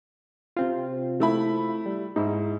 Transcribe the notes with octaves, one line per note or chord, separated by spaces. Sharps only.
C3 C4 F4
A3 E4 B5
G3
G#2 D#4 E4